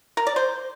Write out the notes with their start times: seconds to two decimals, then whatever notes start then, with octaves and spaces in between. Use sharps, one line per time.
0.17 A#4
0.27 D5
0.36 C5